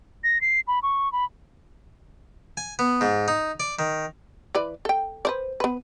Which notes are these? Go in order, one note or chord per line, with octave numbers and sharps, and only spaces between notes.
A#6
C7
B5
C#6
B5
G#5
B3
G#2
D#4
D5
D#3
E3 B4 D5
A4 G5
B4 C5 D5
B3 B4